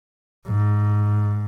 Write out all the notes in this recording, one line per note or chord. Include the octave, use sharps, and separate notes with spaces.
G#2